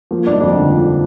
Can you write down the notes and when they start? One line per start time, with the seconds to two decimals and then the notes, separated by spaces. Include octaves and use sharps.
0.11 F3 A#3
0.27 G1 D4
0.33 D#4
0.40 F2 D4
0.56 D3
0.70 F3